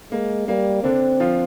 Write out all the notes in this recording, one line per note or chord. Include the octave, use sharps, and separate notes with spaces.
G#3 A#3
G3 A#3
D3 C4 D4
F3 F4